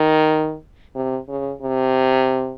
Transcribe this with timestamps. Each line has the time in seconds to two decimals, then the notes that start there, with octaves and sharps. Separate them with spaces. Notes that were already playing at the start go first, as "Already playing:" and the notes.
Already playing: D#3
0.95 C3
1.29 C#3
1.62 C3